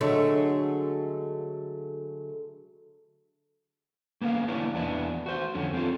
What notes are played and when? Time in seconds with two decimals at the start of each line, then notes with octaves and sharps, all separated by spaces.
0.01 D3 F#3 G#3 A3
4.21 A#3 B3 C#4 F5
4.48 A#3 B3 C#4 D4 E4
4.74 E2 B3 D4 E4
5.26 F#4 C5
5.55 F2 D3 C#4
5.74 C4 C#4 F4 A4